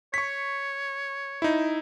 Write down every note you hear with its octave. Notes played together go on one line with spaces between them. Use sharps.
C#5 C#6 B6
D#4 E4